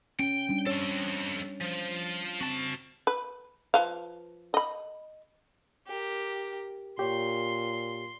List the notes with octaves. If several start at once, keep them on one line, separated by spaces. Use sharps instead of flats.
C#4 G5
G3 C#4 D4
C4 A4 C#5
F3
C4 F#4 A5
B4
F3 B4 F5
D#5 B5
G4 A#4
A#2 G4 C#5 C6